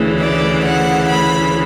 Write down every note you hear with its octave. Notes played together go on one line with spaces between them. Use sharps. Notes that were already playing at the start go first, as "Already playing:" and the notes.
Already playing: D2 C#3 E3
D5
F#5
B5